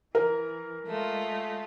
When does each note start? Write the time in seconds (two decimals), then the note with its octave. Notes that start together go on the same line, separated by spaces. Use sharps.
0.15 E3 A#4
0.86 G#3 A3 F4